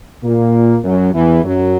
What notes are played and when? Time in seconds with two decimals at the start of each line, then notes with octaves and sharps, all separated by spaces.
0.23 A#2 A#3
0.84 F#2 F#3
1.14 E2 E3
1.44 F#2 F#3